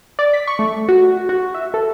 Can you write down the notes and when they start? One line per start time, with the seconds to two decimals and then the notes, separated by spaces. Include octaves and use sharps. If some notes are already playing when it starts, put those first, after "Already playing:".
0.19 D5
0.33 B6
0.48 C#6
0.59 A3
0.89 F#4
1.29 F#4
1.54 E5
1.74 A4